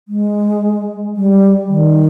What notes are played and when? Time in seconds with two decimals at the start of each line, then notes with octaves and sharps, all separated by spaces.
0.08 G#3
1.16 G3
1.68 D#3